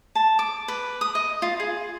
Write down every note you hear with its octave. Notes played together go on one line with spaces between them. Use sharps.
A5
D6
B4
D#6
D#5
F4
G#4